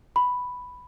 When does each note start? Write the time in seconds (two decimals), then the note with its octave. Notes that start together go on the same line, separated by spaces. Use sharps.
0.16 B5